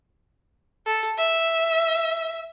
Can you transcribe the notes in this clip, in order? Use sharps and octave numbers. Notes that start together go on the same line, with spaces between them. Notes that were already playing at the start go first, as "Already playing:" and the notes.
A4
E5